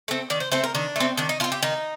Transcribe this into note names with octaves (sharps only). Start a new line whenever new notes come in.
A3 C4
D#3 D5
C5
A3 C4 C5
A#4
D#3 D4
A3 C4
D#3 D4
D#4
A3 F4
C4
G4
D#3 D#4